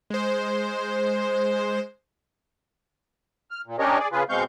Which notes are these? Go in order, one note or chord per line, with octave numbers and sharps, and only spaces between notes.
G#3 C5
F6
A#2
C#4 D4 G4 A#4 C#5 D#5
G#4 D5
C#3 F4 G#4 B4
B2 G#3 C4 F5 C#6 G6